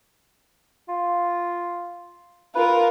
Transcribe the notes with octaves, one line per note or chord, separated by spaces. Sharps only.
F4
F4 A#4 B4